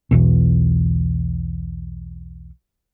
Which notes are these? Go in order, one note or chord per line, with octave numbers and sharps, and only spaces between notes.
B1 E2 B2